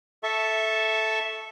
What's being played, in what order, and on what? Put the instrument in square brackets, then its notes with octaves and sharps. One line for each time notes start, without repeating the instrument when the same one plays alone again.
[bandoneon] A4 E5 A5 C#6